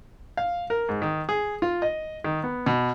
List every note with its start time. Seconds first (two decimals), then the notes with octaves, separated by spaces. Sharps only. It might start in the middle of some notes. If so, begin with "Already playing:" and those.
0.37 F5
0.70 A#4
0.89 G#2
1.02 D#3
1.29 G#4
1.62 F4
1.82 D#5
2.24 D#3
2.43 B3
2.66 B2